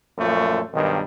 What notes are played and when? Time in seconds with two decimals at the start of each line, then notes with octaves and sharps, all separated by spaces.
0.18 F#2 A#2 F3 A3
0.74 B1 G2 D#3